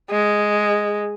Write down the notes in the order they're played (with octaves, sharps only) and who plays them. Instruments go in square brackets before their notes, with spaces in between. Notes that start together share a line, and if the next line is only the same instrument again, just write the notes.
[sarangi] G#3